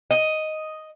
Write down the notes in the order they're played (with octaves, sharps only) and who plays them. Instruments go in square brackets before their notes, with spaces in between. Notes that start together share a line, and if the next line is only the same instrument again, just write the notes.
[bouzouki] D#5